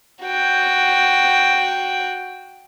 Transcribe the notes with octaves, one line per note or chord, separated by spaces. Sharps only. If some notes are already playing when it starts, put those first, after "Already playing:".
F#4 G5